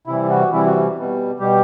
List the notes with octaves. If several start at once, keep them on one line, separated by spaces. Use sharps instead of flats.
C3 E3 G3 E4
F#4
C3 E3 G3 E4
F#4
B2 G3
B2 G3 G4